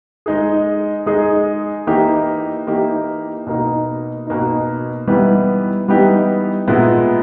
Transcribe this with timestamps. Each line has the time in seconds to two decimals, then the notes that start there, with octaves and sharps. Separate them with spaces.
0.26 G#3 D#4 G#4
1.06 G#3 D#4 G#4
1.87 E3 A#3 D#4 G4
2.67 E3 A#3 D#4 G4
3.47 B2 A#3 D#4
4.27 B2 A#3 D#4
5.07 E3 G3 B3 D#4 G4
5.88 E3 G3 B3 D#4 G4
6.68 A#2 G#3 B3 E4